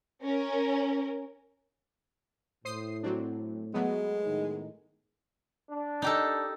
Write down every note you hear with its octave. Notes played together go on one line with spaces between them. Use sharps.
C#4 A#4
A2 C5 D#6 C7
F#3 C4 D4
F#3 G#3 A3 B3
A2 D#3 D#4
D4
D#4 G4 A4